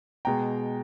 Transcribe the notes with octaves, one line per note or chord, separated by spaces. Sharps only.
B2 G#3 G5 A#5